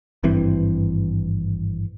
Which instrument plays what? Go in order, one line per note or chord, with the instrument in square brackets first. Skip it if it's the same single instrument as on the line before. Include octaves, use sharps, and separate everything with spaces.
[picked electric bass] G#1 G2 E3 C4